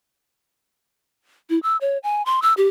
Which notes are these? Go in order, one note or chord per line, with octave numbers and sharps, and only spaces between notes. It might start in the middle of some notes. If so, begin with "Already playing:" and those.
E4
E6
C#5
G#5
C6
E6
G4